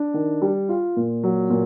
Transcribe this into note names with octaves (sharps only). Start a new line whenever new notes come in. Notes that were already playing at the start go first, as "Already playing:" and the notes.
Already playing: D4
D#3
G3
F4
A#2
F#3
A#2